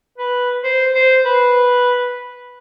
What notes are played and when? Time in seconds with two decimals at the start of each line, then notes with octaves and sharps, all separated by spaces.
0.18 B4
0.64 C5
0.94 C5
1.25 B4